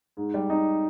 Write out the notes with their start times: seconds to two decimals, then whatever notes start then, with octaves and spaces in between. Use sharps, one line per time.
0.17 G#2
0.34 G3
0.50 D#4